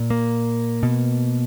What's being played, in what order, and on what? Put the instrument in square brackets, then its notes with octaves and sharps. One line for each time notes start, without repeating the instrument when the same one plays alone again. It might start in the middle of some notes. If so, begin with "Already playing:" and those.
Already playing: [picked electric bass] A#2
A#3
B2